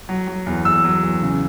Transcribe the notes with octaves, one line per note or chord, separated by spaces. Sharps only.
F#3
F#3
E2
E2 E6
F#3
E2
C#3